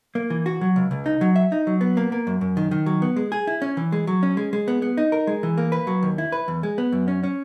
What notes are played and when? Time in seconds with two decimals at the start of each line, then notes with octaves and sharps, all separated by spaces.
0.15 A#3
0.30 E3
0.46 F#4
0.61 F#3
0.76 C#2
0.91 C#2
1.06 D#4
1.21 F#3
1.36 E5
1.52 D#4
1.67 F#3
1.81 B3
1.97 A#3
2.12 A#3
2.27 F#2
2.41 F#2
2.57 D#3
2.71 D#3
2.86 F#3
3.02 B3
3.16 G#3
3.32 G#4
3.47 E4
3.62 C#4
3.77 E3
3.92 G#3
4.07 F#3
4.23 C#4
4.37 G#3
4.53 G#3
4.68 B3
4.82 B3
4.97 D#4
5.12 A#4
5.27 G#3
5.43 E3
5.58 A#3
5.72 B4
5.87 F#3
6.03 D#2
6.18 E4
6.32 B4
6.48 E2
6.63 G#3
6.78 B3
6.92 F#2
7.08 C#4
7.23 C#4